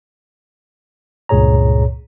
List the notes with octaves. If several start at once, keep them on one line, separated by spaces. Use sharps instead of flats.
C#2 G2 A#2 G#4 C#5 A#5